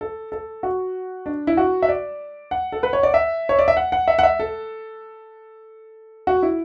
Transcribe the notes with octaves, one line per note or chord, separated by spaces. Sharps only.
A4
A4
F#4
D4
E4
F#4
E5
D5
F#5
A4
B4
C#5
D5
E5
C#5
D5
E5
F#5
F#5
E5
F#5
E5
A4
F#4
E4